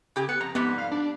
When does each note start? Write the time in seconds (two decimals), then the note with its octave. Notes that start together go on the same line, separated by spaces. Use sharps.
0.16 C#3 G4 G#4
0.29 B3 C#7
0.41 F2 A#5
0.55 F2 G#2 G3 B3
0.78 F5
0.92 D4